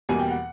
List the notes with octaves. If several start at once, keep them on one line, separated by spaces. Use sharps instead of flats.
E2 B2 G3 A#3 G#5
G5
F#5